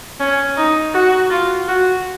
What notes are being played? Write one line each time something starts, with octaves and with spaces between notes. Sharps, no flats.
C#4
D#4
F#4
F4
F#4